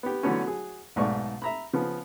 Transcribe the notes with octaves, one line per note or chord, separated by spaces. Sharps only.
B3 G4
D3 E3 F#3 A3 B3 C#4
F#3 G#4
B1 G#2 A3 D5 C#6
E5 A#5 B5
C#3 F3 B3